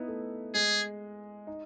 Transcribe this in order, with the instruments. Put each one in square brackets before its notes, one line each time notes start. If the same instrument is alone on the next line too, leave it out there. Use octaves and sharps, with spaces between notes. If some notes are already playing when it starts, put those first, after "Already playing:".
Already playing: [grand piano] B3 D#4 E4
A3
[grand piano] G#3 [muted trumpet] G#4
[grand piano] D#4